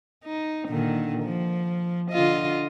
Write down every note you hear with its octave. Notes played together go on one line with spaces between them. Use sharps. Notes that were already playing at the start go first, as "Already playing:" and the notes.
D#4
A#2 D3 D#3
F3
D3 F4 D#5